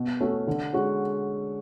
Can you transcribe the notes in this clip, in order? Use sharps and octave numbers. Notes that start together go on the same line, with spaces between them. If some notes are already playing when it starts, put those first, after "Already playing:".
Already playing: B2
A3 C#4 F#4
D3
G#3 C#4 F#4